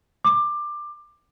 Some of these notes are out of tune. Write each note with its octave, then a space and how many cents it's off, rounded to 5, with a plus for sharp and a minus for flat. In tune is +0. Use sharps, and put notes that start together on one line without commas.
D6 +20